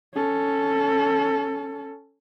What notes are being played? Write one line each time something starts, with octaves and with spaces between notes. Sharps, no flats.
C#4 A4